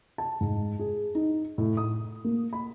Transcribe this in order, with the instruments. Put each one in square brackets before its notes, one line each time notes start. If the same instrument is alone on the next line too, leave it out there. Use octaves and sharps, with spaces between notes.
[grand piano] A5
G#2
G#4
D#4
A2
D#6
A#3
B5